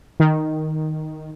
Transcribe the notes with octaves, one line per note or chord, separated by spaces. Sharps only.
D#3